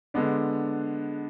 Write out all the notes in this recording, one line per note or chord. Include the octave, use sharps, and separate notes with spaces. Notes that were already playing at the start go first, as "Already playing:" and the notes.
D3 G#3 B3 D4